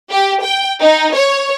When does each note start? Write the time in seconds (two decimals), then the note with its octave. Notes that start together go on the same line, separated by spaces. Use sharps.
0.11 G4
0.44 G5
0.80 D#4
1.15 C#5